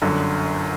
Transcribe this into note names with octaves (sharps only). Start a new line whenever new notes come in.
G1 F#2 D3